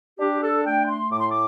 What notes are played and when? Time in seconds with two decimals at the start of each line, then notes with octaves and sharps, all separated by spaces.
0.20 D4 G4
0.43 A4
0.65 A3 G5
0.89 C6
1.11 A2 D6
1.20 C6
1.30 D6